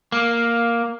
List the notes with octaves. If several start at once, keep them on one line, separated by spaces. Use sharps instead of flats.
A#3